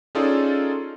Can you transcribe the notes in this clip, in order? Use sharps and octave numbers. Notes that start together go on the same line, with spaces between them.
C#4 D#4 F4 G#4 A4 D5